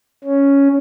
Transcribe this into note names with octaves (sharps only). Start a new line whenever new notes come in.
C#4